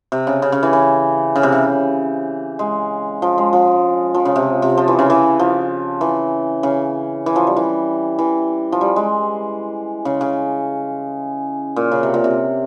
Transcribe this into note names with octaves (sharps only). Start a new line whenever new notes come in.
C3
C#3
C#3
C#3
E3
E3
C#3
C3
C#3
G#3
F3
G#3
F3
F3
C#3
C3
C3
F3
E3
C#3
E3
F3
E3
C#3
E3
F3
G3
E3
E3
F3
G3
G#3
C#3
C#3
A#2
C#3
C3
A#2
C3